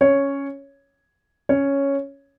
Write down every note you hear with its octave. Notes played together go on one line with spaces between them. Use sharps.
C#4 C#5
C#4 C#5